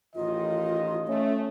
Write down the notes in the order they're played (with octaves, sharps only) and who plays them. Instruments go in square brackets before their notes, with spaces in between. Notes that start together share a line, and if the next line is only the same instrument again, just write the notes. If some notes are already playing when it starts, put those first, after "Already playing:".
[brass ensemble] A1 D#3 [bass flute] F4 [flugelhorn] D#5
[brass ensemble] A3 [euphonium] C#4 [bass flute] E5